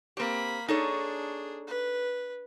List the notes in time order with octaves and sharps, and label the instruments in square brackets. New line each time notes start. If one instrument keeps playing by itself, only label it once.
[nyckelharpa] A#3 B5 [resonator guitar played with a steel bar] C4 G4
[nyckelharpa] D4 G#4 [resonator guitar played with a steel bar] D#4 A4 C#5
[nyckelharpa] B4